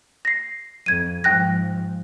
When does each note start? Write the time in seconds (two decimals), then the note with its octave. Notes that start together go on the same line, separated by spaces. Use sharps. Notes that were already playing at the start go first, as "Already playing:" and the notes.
0.25 A#6 C7
0.86 F2 G#6 D#7
1.24 G#2 F3 G5 F#6 A#6